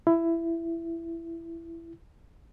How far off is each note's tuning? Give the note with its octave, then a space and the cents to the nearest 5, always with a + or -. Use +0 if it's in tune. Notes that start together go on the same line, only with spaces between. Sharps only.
E4 +15